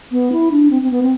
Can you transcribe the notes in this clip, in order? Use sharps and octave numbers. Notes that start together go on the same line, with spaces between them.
B3
E4
D4
C4
C4
B3
C4